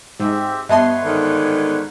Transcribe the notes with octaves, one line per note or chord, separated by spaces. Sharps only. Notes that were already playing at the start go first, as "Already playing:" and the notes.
G#2 C4 G4 E5
G2 B3 B4 C#5 D#5 E5 A5 C6
G#2 D3 D#3